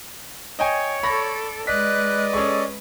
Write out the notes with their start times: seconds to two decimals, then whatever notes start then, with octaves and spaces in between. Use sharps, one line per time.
0.59 C#5 D#5 G5 G#5
1.03 A4 D5 B5 C#6 A#6
1.67 G#3 B4 D5 D#5 F#6 B6
2.33 C#4 G#4 A4 C#6